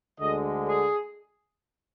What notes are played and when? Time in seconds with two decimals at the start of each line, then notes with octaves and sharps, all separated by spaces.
0.20 D2 D3 G#3 D#5
0.68 G#4